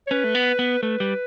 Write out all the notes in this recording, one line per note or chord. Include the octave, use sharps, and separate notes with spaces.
C#5
C#4 B4
A3
B3
B3
A3 B4
G3